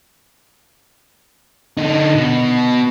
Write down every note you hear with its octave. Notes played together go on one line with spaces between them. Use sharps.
D3 D#4
B2